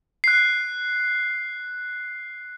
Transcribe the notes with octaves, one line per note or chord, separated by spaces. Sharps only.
F#6 C7